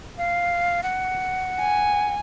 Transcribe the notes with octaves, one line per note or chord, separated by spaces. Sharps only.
F5
F#5
G#5